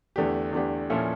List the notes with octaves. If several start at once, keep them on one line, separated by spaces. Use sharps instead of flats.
E2 D3 A3 D4 G4
E2 D3 A3 D4 G4
A#2 F3 C#4 E4 A4